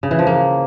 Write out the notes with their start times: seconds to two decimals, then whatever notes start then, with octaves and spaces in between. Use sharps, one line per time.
0.03 C#3
0.11 E3
0.19 F3
0.27 A#3